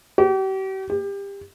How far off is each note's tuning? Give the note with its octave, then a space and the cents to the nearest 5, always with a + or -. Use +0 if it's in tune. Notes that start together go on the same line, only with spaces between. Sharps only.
G4 -40
G4 +25